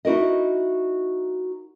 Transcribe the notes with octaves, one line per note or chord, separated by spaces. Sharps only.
D#4 E4 F#4 A#4 D#5